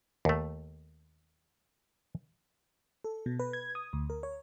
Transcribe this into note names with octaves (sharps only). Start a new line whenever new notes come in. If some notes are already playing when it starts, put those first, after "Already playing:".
D#2 A3
A4
B2
B4
G#6
D#6
D2
A#4
C#5